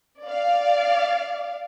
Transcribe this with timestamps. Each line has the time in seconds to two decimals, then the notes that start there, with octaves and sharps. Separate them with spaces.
0.25 D5 F5